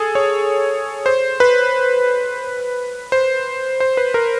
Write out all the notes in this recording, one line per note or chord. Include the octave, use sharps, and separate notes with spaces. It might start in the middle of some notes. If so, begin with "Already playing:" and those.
Already playing: G#4 A4
C#5
C5
B4
C5
C5
B4
A#4